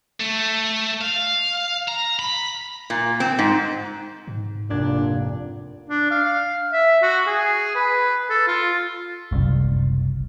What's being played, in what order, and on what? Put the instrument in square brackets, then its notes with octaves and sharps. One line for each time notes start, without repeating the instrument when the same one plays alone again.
[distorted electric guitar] A3
F5
A#5
B5
[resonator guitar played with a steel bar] A#2
C4
G#2
[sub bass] G#2
[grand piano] F1 C2 G#6 [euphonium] A#2 [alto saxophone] D4
[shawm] D4
F5
E5
F#4
G#4
B4
A4
F4
[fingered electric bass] F#1 C2